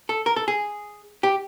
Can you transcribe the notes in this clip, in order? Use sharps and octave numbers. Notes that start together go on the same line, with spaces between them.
A4
A#4
A4
G#4
G4